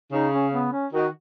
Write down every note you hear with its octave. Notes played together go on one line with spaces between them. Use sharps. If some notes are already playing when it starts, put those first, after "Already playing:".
C#3 D#4
C#4
B3
C#4
D#3 F#4